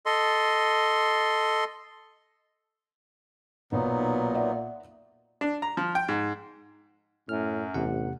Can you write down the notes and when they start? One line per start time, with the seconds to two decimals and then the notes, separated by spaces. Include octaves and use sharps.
0.06 A4 D#5 C6
3.72 B1 A#2 F#3 B3 D#4
4.35 D5 E5 F#5
5.41 D4
5.62 A#5
5.77 F3
5.95 G5
6.08 G#2
7.29 F#2 A2 F6
7.74 A1 E2 C3 F#5